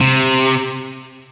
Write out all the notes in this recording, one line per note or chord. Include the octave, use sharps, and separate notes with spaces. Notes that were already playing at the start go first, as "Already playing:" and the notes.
C3